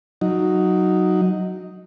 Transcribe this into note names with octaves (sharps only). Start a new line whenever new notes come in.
F#3 D#4